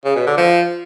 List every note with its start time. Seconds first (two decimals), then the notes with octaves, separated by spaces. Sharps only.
0.05 C#3
0.16 B2
0.27 D3
0.38 F3